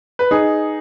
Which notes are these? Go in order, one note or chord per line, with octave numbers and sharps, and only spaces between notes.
B4
D#4 G#4